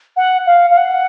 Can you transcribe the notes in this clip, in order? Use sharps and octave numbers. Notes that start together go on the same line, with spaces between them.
F#5
F5
F5
F#5